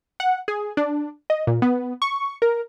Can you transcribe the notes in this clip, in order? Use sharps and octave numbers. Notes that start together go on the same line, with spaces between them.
F#5
G#4
D4
D#5
A#2
B3
C#6
A#4